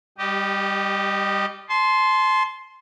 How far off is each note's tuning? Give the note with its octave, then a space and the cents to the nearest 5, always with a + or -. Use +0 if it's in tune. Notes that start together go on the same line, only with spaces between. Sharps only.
G3 +15 G4 -15 D#5 -20
A5 -35 C6 +0